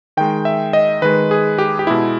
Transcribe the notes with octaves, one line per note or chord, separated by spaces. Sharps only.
D#3 G#3 G5
E5
D#5
D#3 G#3 B4
G#4
G4
G4
B2 G#3 E4